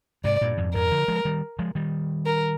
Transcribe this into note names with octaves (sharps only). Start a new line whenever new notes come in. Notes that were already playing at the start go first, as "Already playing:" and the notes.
G#2 C3 D5
G2 A#2
F2 G#2
F2 G#2 A#4
D3 F3
F3 G#3
D#3 G3
F3 G#3
D#3 G3
A#4